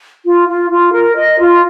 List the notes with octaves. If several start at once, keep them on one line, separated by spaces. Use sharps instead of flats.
F4
F4
F4
A#4
D#5
F4